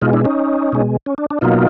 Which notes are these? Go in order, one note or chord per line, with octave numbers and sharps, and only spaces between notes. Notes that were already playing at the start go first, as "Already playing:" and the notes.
B2 G#3 D#4 F4
D4 E4
C#4 D#4
B2 G#3
C#4
D4
D4
B2 F#3 A#3 D#4 F4